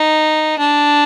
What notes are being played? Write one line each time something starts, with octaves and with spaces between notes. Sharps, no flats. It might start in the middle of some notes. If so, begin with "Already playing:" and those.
Already playing: D#4
D4